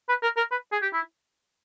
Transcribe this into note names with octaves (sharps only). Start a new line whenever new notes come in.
B4
A#4
A#4
B4
G#4
G4
E4